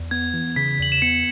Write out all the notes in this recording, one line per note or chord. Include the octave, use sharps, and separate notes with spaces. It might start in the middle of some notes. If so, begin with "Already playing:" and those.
Already playing: E2
B3 G#6
E3
C#3 B6
E2 F#7
E7
B3 C#7